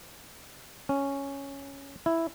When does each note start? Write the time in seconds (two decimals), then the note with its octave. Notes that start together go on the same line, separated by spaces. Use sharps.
0.89 C#4
2.06 E4